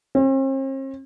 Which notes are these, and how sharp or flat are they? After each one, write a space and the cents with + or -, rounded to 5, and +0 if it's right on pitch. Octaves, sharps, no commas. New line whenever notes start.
C4 +45